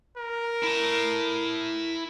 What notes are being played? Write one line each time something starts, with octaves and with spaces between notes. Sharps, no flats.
A#4
E4 A5